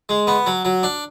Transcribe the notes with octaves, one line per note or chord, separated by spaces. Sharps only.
G#3
B3
F#3
F#3
D4